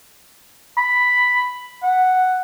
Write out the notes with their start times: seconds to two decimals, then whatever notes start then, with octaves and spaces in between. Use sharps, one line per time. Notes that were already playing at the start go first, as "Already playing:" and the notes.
0.77 B5
1.83 F#5